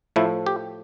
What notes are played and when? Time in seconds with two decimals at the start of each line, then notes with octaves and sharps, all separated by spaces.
0.16 A2 F3 A3 E4
0.46 G4